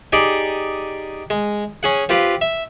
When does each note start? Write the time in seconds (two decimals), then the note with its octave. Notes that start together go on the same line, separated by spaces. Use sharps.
0.13 D#4 G4 G#4 D5 D#5
1.30 G#3
1.83 C#4 G#4 F#5
2.09 C4 F4 G4 B4 F5
2.41 E5